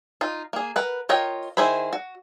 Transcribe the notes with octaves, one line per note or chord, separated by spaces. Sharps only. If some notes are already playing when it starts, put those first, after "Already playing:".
D#4 F4
A#3 G#4
A#4 B4 F#5
F4 A#4 C#5 D#5 G5
D#3 E4 G#4 C5 B5
F#4